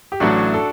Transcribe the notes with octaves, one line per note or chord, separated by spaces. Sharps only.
G4
A1 A2 F#3 D4 F#4
A4